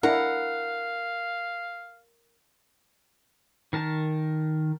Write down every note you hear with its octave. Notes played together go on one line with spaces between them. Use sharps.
D4 E4 A#4 F5 F#5
D#3 A#4 A5